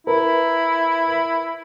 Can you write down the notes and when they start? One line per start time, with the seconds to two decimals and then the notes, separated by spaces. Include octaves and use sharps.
0.07 E4 A#4 B4